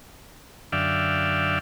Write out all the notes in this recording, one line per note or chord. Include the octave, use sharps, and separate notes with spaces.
F#2 D3 D5 E5 F5 G5